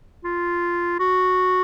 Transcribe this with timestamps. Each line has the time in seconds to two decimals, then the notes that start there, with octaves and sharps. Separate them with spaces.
0.24 F4
0.99 F#4